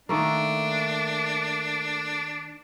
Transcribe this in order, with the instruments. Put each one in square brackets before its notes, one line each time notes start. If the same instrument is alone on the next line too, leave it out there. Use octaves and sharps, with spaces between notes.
[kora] D#3 A3 A#3 [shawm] D4